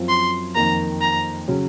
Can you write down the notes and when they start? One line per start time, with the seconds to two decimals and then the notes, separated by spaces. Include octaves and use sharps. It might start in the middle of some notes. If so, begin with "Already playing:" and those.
Already playing: F#2 F3 C4 F4
0.09 C6
0.55 F2 D#3 A#3 A#5
1.01 A#5
1.48 C#3 F#3 C#4